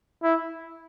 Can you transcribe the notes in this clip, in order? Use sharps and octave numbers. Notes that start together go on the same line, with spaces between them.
E4